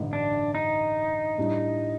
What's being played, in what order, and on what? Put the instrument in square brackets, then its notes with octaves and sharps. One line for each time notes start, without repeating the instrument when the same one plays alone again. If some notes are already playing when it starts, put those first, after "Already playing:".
Already playing: [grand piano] A1 G2 D3 A3 D#4
[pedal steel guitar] D4
D#4
[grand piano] A2 G3 D4